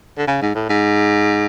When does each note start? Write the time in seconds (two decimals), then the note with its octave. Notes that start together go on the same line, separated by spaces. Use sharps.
0.18 D3
0.27 C#3
0.42 G#2
0.55 A2
0.69 G#2